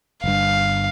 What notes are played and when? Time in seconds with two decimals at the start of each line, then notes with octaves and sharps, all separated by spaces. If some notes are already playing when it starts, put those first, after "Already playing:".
0.24 G1 G2 F5